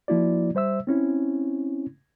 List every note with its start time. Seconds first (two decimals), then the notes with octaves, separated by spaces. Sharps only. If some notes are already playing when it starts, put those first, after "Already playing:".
0.08 F3 A#3 E4 F#4 D5
0.55 G3 C5 E5 E6
0.87 C4 C#4 E4